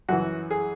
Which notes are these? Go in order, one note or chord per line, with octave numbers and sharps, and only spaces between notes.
F#2 E3 F#4
G#4